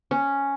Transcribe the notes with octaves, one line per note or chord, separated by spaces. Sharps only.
C#4